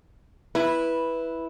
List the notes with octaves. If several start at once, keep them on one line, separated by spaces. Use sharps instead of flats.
E4 B4